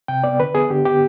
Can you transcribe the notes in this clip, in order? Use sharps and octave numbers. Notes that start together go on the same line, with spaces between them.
C3 G5
B3 D5
D3 B4
B3 G#4
D3 G4
B3 G4